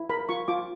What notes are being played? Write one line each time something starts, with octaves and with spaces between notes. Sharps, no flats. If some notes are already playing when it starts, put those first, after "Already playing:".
Already playing: E4
A#4 B5
F4 C#6
F4 D6